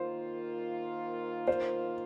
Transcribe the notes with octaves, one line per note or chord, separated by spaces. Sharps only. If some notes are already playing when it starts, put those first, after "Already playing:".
Already playing: D#3 A#3 F4 C5
C5